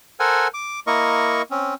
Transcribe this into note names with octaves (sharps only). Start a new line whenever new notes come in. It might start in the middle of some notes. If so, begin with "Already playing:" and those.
A4 A#4 C5 F#5 G#5
D6
A#3 E4 A#4 D#5 C#6
C4 C#4